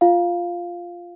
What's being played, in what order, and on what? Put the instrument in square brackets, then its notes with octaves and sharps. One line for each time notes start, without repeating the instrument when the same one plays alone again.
[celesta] F4 F5